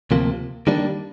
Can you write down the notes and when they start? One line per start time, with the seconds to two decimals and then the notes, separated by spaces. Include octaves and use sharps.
0.11 D2 C3 F3 A#3
0.67 D#3 G3 A#3 D4